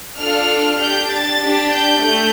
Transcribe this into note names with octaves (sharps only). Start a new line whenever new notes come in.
D4 F4 A4 F6
D4 G4 G6
A6
D4 G4
G6
A3